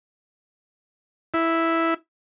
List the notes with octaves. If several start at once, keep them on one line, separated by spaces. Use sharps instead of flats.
E4